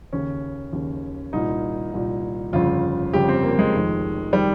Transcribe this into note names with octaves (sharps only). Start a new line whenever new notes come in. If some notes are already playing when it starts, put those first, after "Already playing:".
D#2 C#3 C#4
D#2 C#3
C2 A#2 D#4
C2 A#2
G1 F2 C#3 F4
G1 F2 C#3 G4
C4
A#3
G#3
F1 F2 D#3
D#3 G3